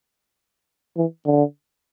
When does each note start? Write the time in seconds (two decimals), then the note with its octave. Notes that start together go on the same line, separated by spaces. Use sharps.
0.97 E3
1.25 D3